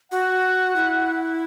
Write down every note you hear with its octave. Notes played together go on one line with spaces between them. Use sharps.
F#4 F#5
E4